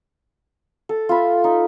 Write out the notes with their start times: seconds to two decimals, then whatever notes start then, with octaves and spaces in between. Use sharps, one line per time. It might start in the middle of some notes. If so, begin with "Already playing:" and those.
0.89 A4
1.09 F4 E5 B5
1.44 D#4